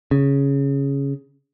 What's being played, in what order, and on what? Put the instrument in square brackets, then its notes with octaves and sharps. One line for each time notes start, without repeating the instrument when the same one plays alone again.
[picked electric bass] C#3